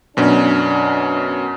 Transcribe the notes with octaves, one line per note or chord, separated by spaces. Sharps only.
F#2 B2 C#4 D4